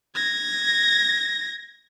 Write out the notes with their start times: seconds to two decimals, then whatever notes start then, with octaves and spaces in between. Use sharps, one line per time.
0.15 G#6 A#6